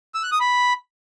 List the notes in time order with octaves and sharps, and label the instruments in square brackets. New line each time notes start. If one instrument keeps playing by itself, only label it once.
[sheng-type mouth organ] E6
F#6
D#6
B5